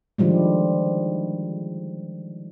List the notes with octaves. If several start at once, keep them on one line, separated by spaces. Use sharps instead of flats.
D3 D#3 F3 G3 G#3